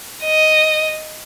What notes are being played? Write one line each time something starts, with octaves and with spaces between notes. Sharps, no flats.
D#5